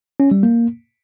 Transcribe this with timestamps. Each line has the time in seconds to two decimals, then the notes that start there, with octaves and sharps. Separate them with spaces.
0.20 C#4
0.31 G3
0.43 A#3